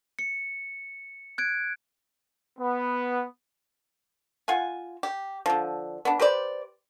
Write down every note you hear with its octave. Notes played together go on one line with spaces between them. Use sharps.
C#7
F#6 G#6 D7
B3
F4 F#5 G#5
G4
D3 F3
B3 D4
G4 B4 C5 D5